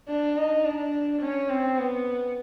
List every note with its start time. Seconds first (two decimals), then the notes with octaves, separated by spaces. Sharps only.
0.08 D4
0.37 D#4
0.65 D4
1.22 C#4
1.50 C4
1.78 B3